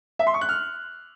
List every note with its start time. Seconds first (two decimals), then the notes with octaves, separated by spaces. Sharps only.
0.19 E5
0.27 C6
0.34 C#6
0.41 F#6
0.49 F6